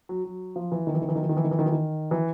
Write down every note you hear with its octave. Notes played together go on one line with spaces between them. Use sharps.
F#3
F#3
F3
E3
D#3
E3
D#3
E3
D#3
E3
D#3
E3
D#3
E3
D#3
E3
D#3
E3